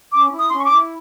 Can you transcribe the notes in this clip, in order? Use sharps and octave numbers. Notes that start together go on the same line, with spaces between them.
C#4 D6
E4
D#6
C#4 C6
C#6
D6
E4